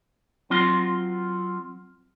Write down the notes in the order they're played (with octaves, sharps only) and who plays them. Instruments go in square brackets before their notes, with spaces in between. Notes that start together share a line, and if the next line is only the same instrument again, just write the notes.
[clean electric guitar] F#3 C4 F4 C6